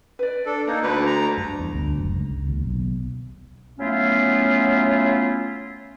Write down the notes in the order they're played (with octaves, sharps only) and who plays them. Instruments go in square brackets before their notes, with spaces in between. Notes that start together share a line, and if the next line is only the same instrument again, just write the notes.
[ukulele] B4 D5
[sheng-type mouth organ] D4 A4
[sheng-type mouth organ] A#3 D#4 [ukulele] A#4
[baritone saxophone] D2 [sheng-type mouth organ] B4
[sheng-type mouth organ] A#5
[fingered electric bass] G2
E2
D2
F#1
C#2
D#2
B1
[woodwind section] F#3 A3 B3 C#4 E4 F4